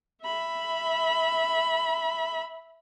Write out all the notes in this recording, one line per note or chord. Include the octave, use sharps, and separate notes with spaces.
E5 B5